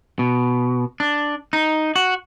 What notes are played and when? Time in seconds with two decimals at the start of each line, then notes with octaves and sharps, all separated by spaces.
0.19 B2
1.00 D4
1.53 D#4
1.96 F#4